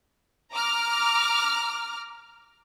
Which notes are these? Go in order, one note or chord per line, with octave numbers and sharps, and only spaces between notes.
A#5 D6 F6